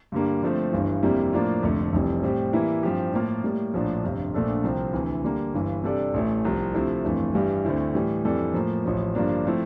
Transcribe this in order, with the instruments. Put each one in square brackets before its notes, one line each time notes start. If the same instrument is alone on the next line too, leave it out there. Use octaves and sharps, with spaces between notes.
[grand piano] G2 D3 G3 A#3
D3 F3 A3 C4
G1 G2 E3
F2 C3 G3 A#3 E4
A2 F3 A#3 D4 F4
F1 F2 D3 A3
F1 F2 E3 G3
A2 G3 C4 G4
E3 G3 A#3 E4
G2 F3 C4 G4
A2 F3 A#3 F4 A#4
A2 G3 A#3
A#1 A2 F3 A#3 D4
G1 F2 C3
A#1 A#2 A3 D4 A4
C2 C3 F3 C4 G4
D2 C3 E3
D3 G3 A#3
G1 G2 E3
C3 G3 D4 A4 D5
A1 A2 E3 A3
C2 C3 F3
D2 C3 F3 A3 E4
G1 F2 E3 A3
G2 E3 G3
D2 D3 A3 C4 E4
A2 E3 G3
F2 E3 G3 D4 A4
A2 F3 A#3
A1 A2 F3
G2 D3 F3 A#3 D4
F3 A3 C4 E4